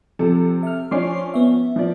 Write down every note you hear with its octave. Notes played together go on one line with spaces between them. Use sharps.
C3 F3 A4
E5 F6
F3 C#4 D4 C6 D6 C7
B3 E5
F3 D5